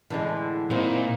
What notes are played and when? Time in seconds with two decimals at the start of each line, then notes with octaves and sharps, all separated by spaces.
0.10 A2 D3 E3 G#3
0.70 A#2 A#3 C4 D#4 E4 C5